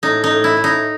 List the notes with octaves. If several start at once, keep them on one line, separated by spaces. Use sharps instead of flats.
A2 D#4
D#4
A2
E4
A2
D#4